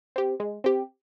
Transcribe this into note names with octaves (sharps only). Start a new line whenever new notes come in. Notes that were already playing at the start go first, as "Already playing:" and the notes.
C4 G4
G#3
C4 G4